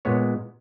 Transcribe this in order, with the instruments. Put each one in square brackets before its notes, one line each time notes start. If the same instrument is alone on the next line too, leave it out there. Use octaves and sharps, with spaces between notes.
[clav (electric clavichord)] A#2 G#3 B3 C#5